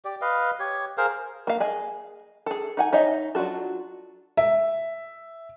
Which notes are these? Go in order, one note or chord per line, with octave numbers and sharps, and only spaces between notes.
G4 D5
B4 D#5 F5
G4 C#5
G#4 A#4 C5 F5
A#3 F5
G#4 D#5 G#5
G#4 A4
D#4 F#5 G#5
D#4 C#5 D#5 E5
F#3 D4 F4 F#4 A4
E5